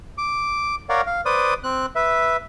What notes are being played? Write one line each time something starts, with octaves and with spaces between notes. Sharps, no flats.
D6
A#4 C#5 D5 F5 F#5
F5
B4 C5 D5 D#6
C4 F#6
B4 E5